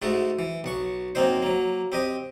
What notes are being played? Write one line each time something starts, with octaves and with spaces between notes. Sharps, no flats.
G#2 G#3 A3 F#4
E3
B1 F#5 C#6
F#2 A#3 C4 D#4 C5
F#3 A#3
C4 G4 D#5